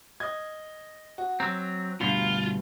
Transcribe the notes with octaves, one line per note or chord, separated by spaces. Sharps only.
D#5 G#6
F#4
F#3 C4 A#5
D2 G2 B2 F4